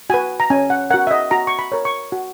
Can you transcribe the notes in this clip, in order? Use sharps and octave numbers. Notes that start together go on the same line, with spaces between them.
F#4 B4 G#5
A#5
C#4 G#5
F#5
F#4 A#4 F#5
E5
D#5
F#4 A#5
C#6
B5
A#4 C#5
C#6
F#4